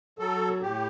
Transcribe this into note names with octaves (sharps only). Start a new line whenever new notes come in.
F#3 A4
A2 G4